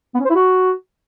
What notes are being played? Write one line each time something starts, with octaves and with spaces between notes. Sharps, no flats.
B3
C#4
C5
E4
F#4